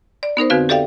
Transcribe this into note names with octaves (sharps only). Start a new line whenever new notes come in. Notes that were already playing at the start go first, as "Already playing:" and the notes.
D5
B3 D#4 A#4 C5
F2 D3 C4 F#4 B4 F5
G4 A4 D5 E5 F5 G5